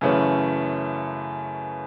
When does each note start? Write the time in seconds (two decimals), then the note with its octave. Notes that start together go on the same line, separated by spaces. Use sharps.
0.01 F#2 C#3 E3 A3 C#4